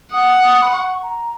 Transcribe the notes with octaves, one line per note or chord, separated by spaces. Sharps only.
F#5 D#6
D#6
B5
C#6
A#5